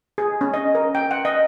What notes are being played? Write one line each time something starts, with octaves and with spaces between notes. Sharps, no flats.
G#4
C#4
D#5
A#4
G5
F#5
D#5